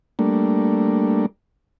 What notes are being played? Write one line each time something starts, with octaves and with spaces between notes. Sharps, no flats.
G3 A3 A#3 D4